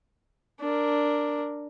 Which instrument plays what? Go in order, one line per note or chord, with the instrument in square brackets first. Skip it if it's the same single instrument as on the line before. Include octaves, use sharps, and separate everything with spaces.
[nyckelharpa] D4 A#4